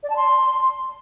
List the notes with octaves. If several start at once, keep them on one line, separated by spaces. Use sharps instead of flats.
D5
A5
C6